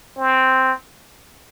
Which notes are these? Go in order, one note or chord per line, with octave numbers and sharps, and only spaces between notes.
C4